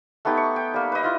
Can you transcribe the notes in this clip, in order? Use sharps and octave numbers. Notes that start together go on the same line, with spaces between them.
A3 B3 D#4 G4
C#6
G5
G3 A#3
B4 D#5
E4 F4 D#5